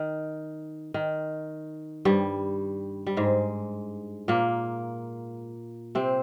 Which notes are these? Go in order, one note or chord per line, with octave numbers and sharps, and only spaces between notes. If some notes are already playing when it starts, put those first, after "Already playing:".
Already playing: D#3
D#3
G2 G3
G3
G#2 G#3
A#2 A#3
C3 C4